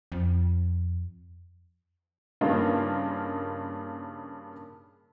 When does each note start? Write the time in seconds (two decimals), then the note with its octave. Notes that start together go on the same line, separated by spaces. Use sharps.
0.12 F2
2.41 G2 C#3 A#3 D#4 F4